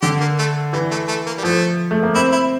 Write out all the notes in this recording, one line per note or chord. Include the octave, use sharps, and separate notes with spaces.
D3 G4
A#3
A3
E3 G3
A3
A3
A#3
G3
F3 A3
A3
A#3
C4 E4
E4